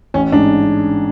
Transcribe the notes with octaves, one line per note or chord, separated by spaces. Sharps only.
A1 C#4
G#2 D4